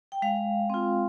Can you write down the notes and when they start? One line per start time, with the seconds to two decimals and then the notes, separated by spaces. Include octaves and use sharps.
0.12 G5
0.22 G#3 F5
0.70 C4 F4